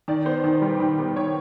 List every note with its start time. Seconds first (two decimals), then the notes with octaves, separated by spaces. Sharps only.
0.08 D#3 D5
0.25 B3 C5
0.44 D#3
0.62 G3
0.80 D#3
0.99 B3
1.16 D#3 C#5